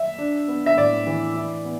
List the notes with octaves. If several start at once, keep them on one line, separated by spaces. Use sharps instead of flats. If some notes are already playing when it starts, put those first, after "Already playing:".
Already playing: E5
D4
B3
E5
A2 D5
E3
E4
B3